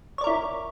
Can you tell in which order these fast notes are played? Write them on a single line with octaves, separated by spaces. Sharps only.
C#5 D5 A#4 E4